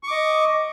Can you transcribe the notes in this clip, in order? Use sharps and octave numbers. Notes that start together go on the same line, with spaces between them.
D#5 C#6 D6